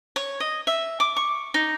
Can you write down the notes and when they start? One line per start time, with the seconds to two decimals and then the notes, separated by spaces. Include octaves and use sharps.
0.16 C#5
0.40 D#5
0.67 E5
1.00 D6
1.16 C#6
1.54 D#4